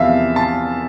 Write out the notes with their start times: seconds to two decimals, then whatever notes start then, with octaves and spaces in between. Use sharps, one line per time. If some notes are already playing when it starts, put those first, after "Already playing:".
Already playing: E2 C3 F3 E5 F5
0.36 A5